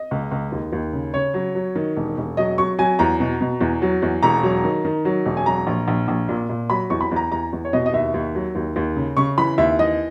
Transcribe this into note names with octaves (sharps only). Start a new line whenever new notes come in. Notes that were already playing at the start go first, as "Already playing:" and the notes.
Already playing: D#5
C#2
C#2
D#2
D#2
C#3
C#3 C#5
F#3
F#3
D#3
E1
E1
F#3 D#5
F#3 C#6
F#3 G#5
E2 A#5
B2
B2
E2
F#3
E2
E1 A#5
F#3
D#3
D#3
F#3
E1
G#5
F#3 A#5
A#1
A#1
A#1
A#2
A#2
F#3 B5
E2 C#6
B5
E2 A#5
E2 A#5
E2
C#5
B2 D#5
D#5
D#2 E5
D#2
F#3
D#2
D#2
C#3
C#3 C#6
E3 B5
D#2 E5
E3 D#5